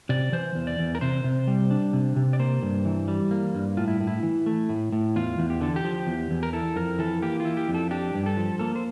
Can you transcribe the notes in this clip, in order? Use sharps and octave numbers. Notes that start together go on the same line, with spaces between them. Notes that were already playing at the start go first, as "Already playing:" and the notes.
C3 D5
E3 C5
E2
D5
E2
A#4
C3 C5
C3
G3
D4
C3
C3
D5
A#3 C5
G2
E3
G3
A#3
G2
A2 F4
E4
A2
E4
E3
A3
A2
A2
E2 F4
E2
G4
D3 A4
G4
F3
E2
E2
A#4
E4 A4
F2 A#4
E3 A4
A#3 G4
F4
E4
G4
F2
A4
D4 G4
G2
A4
F3
A#3 A4
C5